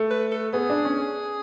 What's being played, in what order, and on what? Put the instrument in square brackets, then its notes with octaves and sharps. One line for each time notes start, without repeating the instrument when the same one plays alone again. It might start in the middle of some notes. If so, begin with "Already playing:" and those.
Already playing: [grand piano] A3
[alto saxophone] B4
A4
[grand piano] B3 [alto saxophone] G#4
[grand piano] D4
C#4